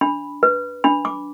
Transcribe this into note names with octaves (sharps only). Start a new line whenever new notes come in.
D4 B5
B4
D4 B5
D6